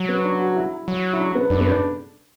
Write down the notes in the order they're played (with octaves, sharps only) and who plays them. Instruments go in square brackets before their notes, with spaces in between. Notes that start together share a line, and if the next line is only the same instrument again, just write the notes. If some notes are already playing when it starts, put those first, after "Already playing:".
Already playing: [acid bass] F#3
[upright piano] B3
D4
F#4
E4
[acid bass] F#3
[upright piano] E4
D4
B3
[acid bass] F#2 [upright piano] D4
[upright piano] B3
D4